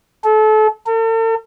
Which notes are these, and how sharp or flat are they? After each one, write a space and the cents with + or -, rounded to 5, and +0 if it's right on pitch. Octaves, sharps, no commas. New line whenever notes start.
A4 -30
A4 +45